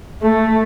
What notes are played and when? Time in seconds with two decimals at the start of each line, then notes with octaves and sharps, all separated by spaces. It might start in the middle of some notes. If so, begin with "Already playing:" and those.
0.22 A3